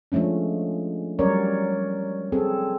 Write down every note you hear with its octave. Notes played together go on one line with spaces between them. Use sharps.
F3 G#3 A3 C#4 D4
F#3 G3 C#4 A#4 C#5 D5
C4 G#4 A4